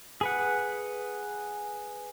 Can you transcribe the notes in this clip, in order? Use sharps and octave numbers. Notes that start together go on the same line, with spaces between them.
G#4 B4 F#5